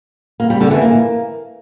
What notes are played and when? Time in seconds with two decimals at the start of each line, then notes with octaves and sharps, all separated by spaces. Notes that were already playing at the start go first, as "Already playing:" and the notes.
0.40 A#3
0.50 G3
0.60 D3
0.71 E3
0.81 A#3